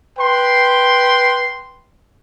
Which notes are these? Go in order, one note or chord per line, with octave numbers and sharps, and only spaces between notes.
B4 G5 C6